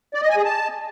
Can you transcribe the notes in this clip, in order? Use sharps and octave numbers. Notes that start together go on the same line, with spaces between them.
D5
D#5
G#5
G#4
A5